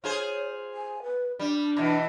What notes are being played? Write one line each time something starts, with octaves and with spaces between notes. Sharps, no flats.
F4 G#4 C5 C#5
G#5
B4
G3 D4
B2 E3